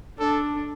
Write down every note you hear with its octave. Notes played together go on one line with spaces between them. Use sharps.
D4 A4